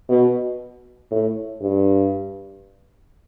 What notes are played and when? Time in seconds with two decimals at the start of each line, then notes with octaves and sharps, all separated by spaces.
0.09 B2
1.11 A2
1.61 G2